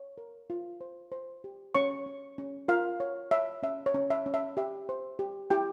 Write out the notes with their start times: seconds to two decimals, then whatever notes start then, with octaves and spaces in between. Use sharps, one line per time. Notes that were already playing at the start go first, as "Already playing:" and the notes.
Already playing: C#5
0.18 A#4
0.50 F4
0.81 C5
1.12 C5
1.44 G4
1.75 C#4 C#5 C#6
2.06 C#4
2.38 C#4
2.68 F4 A#4 F5
3.00 C#5
3.31 C#5 E5
3.63 C#4 E5
3.86 C#5
3.94 C#4
4.10 E5
4.26 C#4
4.34 E5
4.57 G4 E5
4.89 C5
5.19 G4
5.50 E4 G4 G5